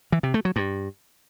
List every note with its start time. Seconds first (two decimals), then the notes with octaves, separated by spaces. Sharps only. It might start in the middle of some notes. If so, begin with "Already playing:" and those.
0.12 E3
0.23 C3
0.34 A3
0.45 F#3
0.56 G2